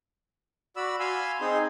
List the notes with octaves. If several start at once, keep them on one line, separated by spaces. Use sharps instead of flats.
F#4 D5 B5 E6
F5 G#5 B5 C6 E6
C4 D#4 G#4 C6